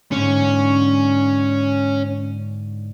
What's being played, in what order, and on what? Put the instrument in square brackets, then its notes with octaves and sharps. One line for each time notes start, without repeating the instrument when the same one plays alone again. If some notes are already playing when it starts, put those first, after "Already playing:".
[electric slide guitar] G#2 D3 [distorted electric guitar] C#4